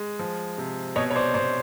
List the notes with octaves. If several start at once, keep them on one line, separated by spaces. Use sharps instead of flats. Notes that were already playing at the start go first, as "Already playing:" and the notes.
Already playing: G#3
F3
C3
B2 C#5 D#5
C#5
C5 D5
B2 C5 D5